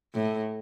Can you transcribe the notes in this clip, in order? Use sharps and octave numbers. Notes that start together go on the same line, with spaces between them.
A2